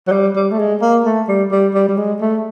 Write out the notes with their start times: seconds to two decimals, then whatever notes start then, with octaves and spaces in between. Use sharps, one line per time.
0.07 F#3
0.12 G3
0.36 G3
0.51 A3
0.59 G#3
0.82 A#3
1.05 A3
1.28 G3
1.51 G3
1.74 G3
1.88 G3
1.97 G#3
2.21 A3